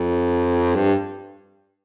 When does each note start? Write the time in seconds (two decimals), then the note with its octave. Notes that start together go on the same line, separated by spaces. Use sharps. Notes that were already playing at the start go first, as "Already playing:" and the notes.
Already playing: F2
0.75 G2